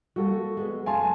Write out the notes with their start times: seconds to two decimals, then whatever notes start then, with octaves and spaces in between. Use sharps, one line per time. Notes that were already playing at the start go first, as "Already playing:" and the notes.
0.16 G3 A#3 F#4 A4
0.57 G#3 B3
0.86 F#2 A3 F5 G#5 A5 C6